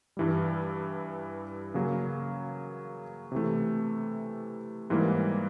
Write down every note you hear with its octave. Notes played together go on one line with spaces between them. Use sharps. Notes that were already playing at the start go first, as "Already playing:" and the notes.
G2 E3 G3
C#3 F#3 A#3
C3 E3 A3
G#2 E3 G3 A#3